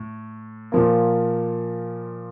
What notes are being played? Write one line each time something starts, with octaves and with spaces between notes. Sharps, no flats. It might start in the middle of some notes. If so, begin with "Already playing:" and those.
Already playing: A2
A#2 F3 A#3